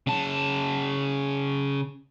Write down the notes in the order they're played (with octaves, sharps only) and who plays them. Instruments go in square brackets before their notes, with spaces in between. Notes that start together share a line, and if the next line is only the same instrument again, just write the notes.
[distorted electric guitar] C#3 A5